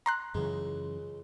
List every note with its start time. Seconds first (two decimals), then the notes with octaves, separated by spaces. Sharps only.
0.06 A#5 C6 F#6
0.35 C#2 F#2 C#3 E3 G#3